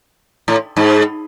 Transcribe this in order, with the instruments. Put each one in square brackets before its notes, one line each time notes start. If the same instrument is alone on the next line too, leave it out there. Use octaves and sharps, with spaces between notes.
[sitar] A2
G#2